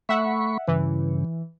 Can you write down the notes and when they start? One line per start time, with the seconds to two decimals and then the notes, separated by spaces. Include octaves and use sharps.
0.09 A3 E5 F#5 B5 C#6
0.68 G2 C#3 E3